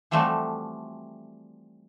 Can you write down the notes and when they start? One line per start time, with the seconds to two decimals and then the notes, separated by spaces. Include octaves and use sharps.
0.11 E3 F3 G3 A3 C4 F#4